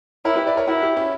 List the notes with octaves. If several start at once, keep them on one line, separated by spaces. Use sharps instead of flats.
E4 A#4 C#5
G4 B4
B4 D5
A#4 C#5
E4 F#4 A#4
E4 G4
C#4 E4